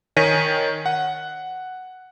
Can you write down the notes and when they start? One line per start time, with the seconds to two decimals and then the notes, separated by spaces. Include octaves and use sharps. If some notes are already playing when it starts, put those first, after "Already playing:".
0.17 D#3 C#5 G#5 A#6 B6 D#7
0.86 F#5